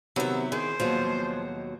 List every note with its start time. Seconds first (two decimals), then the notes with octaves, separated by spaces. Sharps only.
0.16 C3 D#3 F#3 B3 E5
0.52 D#3 E3 G#4 C5
0.80 D#2 B2 F3 F#3